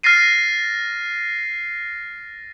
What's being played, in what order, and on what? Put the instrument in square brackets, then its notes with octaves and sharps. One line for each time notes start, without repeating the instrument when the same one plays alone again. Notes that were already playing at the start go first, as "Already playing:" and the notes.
[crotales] F6 A6 A#6 C7 D#7